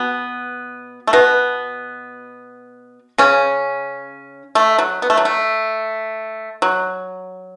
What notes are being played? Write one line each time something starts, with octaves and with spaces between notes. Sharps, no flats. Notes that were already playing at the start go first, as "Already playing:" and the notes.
Already playing: B2 B3
A3
B2 B3
C#3 C#4
A3
F#3
B3
A3
F#3
A3
F#3